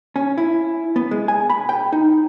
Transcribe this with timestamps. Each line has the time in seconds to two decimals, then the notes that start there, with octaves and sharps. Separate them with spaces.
0.16 C#4
0.38 E4
0.96 B3
1.11 G#3
1.28 G#5
1.50 B5
1.69 G5
1.92 D#4